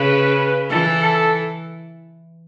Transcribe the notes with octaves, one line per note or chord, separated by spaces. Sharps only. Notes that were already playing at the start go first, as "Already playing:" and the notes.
Already playing: C#3 B4
E3 A4
A4